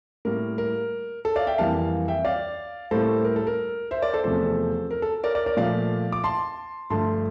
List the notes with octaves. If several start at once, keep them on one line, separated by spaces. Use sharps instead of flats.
A2 G3 A#3 A#4
A#4
A4
D5 F5
E5 G5
F2 E3 G3 A#3 F5 A5
E5 G5
D5 F5
A2 G3 A#3 A4 C5
A#4
A4
A#4
C5 E5
A#4 D5
A4 C5
E2 C3 F3 A3 A4 C5
A#4
A4
A#4 D5
A#4 D5
A#4 D5
A#2 F3 A3 D5 F5
D6
A5 C6
G2 D3 F3 A3 A5 C6